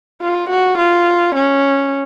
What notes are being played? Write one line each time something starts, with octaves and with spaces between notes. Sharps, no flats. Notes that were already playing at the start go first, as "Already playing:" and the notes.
F4
F#4
F4
C#4